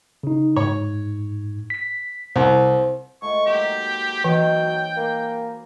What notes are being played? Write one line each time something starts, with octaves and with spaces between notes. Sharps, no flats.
C#3 D#4
G#2 C#5
B6
C2 C5
G#2 A3 F4 C#6
F#3 A#3 C4 G4
E3 F#3 D#4 G5
A#3 G#5 B5 D6